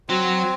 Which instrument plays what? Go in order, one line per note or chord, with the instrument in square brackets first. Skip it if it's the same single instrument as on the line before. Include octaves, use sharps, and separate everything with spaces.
[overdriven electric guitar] F#3 [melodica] C4